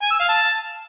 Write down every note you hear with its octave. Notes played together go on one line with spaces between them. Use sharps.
G#5
E6
F5
A5